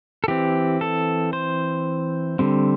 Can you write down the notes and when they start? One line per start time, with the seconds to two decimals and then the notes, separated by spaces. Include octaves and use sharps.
0.24 A4
0.28 E3 C4 G4
0.81 A4
1.33 C5
2.39 D3 G3 C4